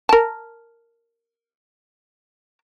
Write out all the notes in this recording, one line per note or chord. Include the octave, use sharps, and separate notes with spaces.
A#4 A5